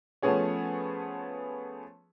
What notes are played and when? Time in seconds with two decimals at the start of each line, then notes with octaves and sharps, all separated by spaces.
0.22 F3 A3 B3 C#4 G#4 C#5